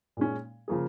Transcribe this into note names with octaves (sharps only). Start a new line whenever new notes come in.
A#2 G#3 C#4
C#3 F3 A#3 F4 G#4